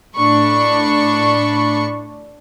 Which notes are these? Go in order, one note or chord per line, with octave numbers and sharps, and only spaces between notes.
A2 D4 B5 C#6